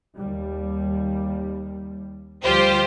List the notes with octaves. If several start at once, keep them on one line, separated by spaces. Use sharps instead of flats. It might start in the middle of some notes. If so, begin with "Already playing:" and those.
D#2 G3
D2 F3 G3 F4 G4 C5